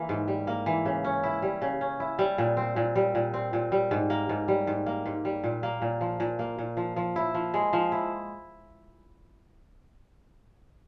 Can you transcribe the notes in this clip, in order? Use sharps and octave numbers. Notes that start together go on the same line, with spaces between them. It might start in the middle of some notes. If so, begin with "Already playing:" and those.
Already playing: E3 A#3
G#2
G3
A#3
E3
C#3
C#4
E4
G3
C#3
C#4
E4
G3
A#2
C4
A#2
G3
A#2
C4
A#2
G3
G#2
A#3
G#2
G3
G#2
A#3
G#2
G3
A#2
A#3
A#2
F3
A#2
A#3
A#2
F3
F3
E4
F3
G#3
F3
E4